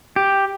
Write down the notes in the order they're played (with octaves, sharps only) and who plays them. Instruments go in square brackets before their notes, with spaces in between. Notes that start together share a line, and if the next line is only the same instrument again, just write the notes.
[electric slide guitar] G4